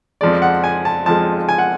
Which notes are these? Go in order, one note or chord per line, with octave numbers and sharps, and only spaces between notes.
F2 F3 G#3 D5
F#5
G#5
A5
F2 F3 G#3 A5
G#5
F#5